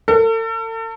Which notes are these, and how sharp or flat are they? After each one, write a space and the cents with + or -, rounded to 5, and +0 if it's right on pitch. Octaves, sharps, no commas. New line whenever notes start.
A4 +40